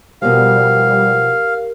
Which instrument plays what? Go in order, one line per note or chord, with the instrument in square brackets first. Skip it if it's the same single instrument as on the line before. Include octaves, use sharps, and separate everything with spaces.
[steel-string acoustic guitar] B2 F3 [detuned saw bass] G3 [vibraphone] G4 A#4 [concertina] F5